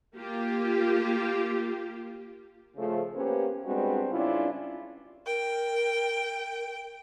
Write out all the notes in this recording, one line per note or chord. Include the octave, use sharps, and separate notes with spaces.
A#3 F4 G4
C#3 F3 A3
A#3 B3 C#4 G4 B4 C5
G3 G#3 B3 C4 D4 F#4
G2 C#3 C#4 D4 E4 F4
A#4 G5